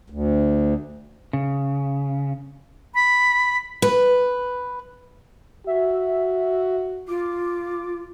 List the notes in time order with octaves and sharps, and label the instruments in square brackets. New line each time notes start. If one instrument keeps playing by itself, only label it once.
[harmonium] D2
[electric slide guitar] C#3
[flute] B5
[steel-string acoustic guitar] B4
[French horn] F#4 [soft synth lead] E5
[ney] F4 [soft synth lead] D6